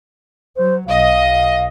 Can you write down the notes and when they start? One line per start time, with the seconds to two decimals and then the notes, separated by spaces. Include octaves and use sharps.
0.57 F#3 C5
0.88 B1 D#5 F5